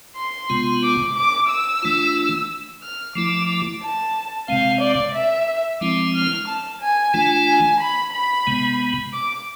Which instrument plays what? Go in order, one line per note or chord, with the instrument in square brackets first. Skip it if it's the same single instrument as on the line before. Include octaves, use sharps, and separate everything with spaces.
[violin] C6
[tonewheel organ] C3 G#3 B3 F4
[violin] D6
D6
E6
[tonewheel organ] E3 A3 D4 F4
[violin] F6
[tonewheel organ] F3 A3 E4 [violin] D6
[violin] A5
[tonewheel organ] C3 G#3 C4 [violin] F5
[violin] D5
E5
[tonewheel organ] F3 G#3 C4 E4 [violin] D6
[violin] F6
A5
G#5
[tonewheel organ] E3 A3 D4 F4
[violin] G#5
B5
B5
[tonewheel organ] C3 G#3 B3
[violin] D6